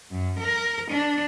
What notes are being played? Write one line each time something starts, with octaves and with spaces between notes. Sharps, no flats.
F#2
A#4
D4